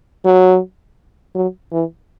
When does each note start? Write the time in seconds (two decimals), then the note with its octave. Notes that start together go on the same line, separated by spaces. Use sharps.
0.25 F#3
1.35 F#3
1.72 E3